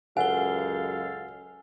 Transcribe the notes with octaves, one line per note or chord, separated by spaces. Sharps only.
C#2 F#2 A4 F5 F#5 G#5 G7